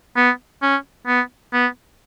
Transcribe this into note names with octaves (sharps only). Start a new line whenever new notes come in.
B3
C#4
B3
B3